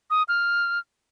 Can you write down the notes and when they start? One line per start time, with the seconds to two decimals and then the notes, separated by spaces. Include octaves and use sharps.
0.10 D#6
0.28 F6